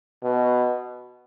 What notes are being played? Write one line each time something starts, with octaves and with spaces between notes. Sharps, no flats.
B2